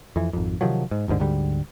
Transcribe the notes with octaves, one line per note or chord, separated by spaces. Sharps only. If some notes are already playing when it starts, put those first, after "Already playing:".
F2 E3
G#1 F2
C3 D#3 F3 F#3
G#2
G1 D#2 G#2 D3
D2 G#2 D3 G3